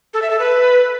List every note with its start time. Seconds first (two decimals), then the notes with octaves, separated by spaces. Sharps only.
0.14 A4
0.22 E5
0.31 A4
0.39 B4